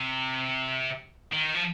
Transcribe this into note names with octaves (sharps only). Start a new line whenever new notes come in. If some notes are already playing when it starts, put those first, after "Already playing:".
Already playing: C3
D#3
F3